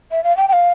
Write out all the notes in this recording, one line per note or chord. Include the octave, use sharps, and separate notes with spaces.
E5
F5
G5
G5
F5